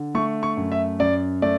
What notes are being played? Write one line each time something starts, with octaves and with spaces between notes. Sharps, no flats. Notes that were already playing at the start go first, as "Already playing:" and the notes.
Already playing: D3
A3 C#6
C#6
F#2
E5
F#2 D5
A3 D5